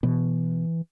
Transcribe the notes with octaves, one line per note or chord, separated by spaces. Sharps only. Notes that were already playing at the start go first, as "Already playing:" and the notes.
B2 E3